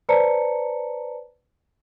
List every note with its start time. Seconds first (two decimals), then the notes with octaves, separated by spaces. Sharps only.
0.09 B4 C5 D5 A5 A#5 C#7